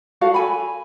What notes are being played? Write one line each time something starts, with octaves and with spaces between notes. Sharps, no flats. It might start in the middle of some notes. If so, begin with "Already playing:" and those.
F#4 A4 F5
A4 G#5 B5